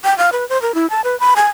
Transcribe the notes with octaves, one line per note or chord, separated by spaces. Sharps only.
G5
F5
B4
C5
A#4
E4
A5
B4
B5
G#5